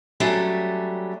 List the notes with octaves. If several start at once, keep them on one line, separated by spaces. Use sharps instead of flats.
F#3 G3 A3 C#4 D4